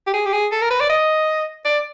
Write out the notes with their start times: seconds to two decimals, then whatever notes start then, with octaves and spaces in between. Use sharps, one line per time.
0.07 G4
0.13 G#4
0.25 G4
0.33 G#4
0.52 A4
0.61 A#4
0.70 B4
0.80 D5
0.89 D#5
1.65 D5